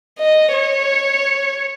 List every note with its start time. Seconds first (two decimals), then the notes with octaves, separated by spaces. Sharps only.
0.19 D#5
0.53 C#5